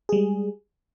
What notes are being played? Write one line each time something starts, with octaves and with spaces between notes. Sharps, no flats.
G3 G#3 G#4